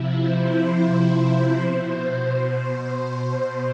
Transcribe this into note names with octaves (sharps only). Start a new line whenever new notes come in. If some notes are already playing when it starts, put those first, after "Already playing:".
Already playing: C3 F3 E4
C5
B2